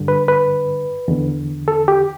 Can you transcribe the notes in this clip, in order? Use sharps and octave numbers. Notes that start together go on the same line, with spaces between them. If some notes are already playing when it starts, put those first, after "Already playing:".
Already playing: G2 D3
B4
B4
E2 D3
A4
G4